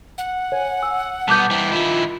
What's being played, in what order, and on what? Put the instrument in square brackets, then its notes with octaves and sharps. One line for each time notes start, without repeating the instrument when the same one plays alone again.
[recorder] F#5
[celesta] C#5 [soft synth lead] G#5
[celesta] E6
[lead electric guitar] B1 B3 [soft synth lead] G3 [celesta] A5 D6 G6
[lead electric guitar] E3 C4
[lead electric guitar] D#3 E4 [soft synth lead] F4